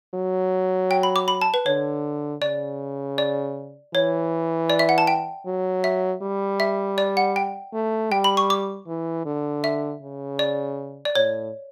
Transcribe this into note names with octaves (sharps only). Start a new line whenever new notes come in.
F#3
G5
B5
D6
B5
A5
B4
D3 C#5
C#3 D5
D5
E3 C#5
D5
E5
F#5
A5
G5
F#3
E5
G3
E5
D5
F#5
G5
A3
G3 G5
B5
C#6
D6
E3
D3
E5
C#3
D5
D5
A2 C#5